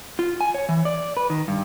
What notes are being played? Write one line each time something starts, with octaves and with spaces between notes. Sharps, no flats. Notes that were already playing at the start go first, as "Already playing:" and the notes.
F4
G#5
C#5
E3
D5
B4
D#3
G2